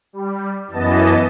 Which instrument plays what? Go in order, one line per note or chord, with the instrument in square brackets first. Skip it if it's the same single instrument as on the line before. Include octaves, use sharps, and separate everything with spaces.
[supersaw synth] G3
[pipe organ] F#2 E3 [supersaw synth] B3 D#5 A5